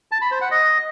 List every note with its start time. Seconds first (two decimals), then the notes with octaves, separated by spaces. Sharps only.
0.12 A5
0.21 B5
0.31 C5
0.41 F#5
0.51 D#5